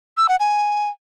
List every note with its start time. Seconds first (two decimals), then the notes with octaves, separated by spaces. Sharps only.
0.18 E6
0.29 F#5
0.40 G#5